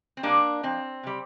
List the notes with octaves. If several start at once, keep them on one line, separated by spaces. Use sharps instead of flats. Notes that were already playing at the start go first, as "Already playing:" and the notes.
C4
C3 G3 A#3 D4
F2 C4
C3 G3